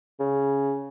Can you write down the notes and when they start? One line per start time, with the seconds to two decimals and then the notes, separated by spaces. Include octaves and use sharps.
0.20 C#3